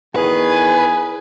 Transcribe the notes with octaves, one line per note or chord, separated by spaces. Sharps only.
E2 D#3 G#4 B4 G#5